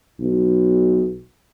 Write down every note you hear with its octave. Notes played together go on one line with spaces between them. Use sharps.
B1